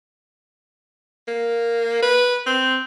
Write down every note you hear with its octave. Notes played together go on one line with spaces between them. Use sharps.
A#3
B4
C4